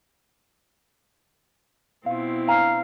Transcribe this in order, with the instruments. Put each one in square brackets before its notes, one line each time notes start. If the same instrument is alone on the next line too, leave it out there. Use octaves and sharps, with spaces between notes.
[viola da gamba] B2 C4 E4 [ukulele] F4 F5
[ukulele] D4 G#5 A#5 [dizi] F5